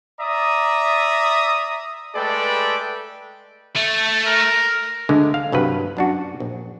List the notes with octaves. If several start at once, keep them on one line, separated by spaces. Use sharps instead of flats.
D5 E5 A#5 D#6
G#3 A3 A4 B4 D5 G5
A3
A#4
D2 D3 G#3
F5
C2 G2 F#3 B4
F#2 D4 F#4
A#1